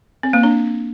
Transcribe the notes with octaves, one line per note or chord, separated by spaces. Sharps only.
C4
A#3
D4